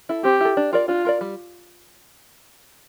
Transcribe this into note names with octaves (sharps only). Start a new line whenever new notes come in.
E4 A4
C4 G4
E4 A4
D4
F4 A#4 D5
D4 F4
F4 A#4 D5
G3